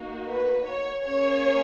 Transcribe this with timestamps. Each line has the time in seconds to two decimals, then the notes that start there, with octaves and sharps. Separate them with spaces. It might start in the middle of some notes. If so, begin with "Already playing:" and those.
Already playing: A#3 D#4 F#4
0.27 B4
0.66 C#5
1.04 A#3 C#4 G#4 C#5